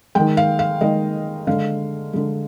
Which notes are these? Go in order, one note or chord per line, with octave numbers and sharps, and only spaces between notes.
D#3 G#3 G5
F5
F5
D#3 G#3 D#5
D3 G#3 F5
D3 G#3